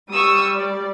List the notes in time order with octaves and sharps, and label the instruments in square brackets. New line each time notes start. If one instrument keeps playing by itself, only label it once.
[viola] G3 [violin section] C#6 D#6 E6
[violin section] D5